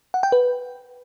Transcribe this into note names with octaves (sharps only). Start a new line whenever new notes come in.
F#5
G5
B4